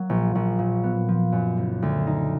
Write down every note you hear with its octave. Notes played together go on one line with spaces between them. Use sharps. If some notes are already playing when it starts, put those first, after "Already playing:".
Already playing: F#3 A#3
A#1
A#1
A#2
B3
F3
F#2
F#1
D2
D#4